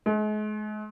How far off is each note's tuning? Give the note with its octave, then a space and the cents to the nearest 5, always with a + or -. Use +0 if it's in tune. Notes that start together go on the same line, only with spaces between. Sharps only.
G#3 +40